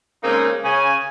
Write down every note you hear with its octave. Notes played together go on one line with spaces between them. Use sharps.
C#3 G#3 A#3 C4 D#4 G#4
C#3 G#5